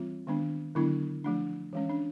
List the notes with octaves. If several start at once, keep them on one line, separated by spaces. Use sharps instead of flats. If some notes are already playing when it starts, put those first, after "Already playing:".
Already playing: E3 G3 C4 F4
D#3 G#3 B3 D4
D3 F#3 B3 D4 E4
F3 A3 D4
E3 G#3 C#4
D4